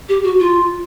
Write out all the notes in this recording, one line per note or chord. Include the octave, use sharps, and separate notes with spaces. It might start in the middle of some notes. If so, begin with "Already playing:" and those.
G4
F#4
F4